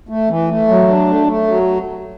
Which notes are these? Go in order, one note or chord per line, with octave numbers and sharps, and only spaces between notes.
A3
E3
A3
F#3
D4
A3
A3
F#3